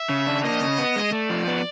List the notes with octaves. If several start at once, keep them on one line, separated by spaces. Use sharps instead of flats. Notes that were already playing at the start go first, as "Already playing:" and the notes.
Already playing: E5
C#3
D4
A#3 D#5
C#3
B3
G#3
A3 D5
F3
B3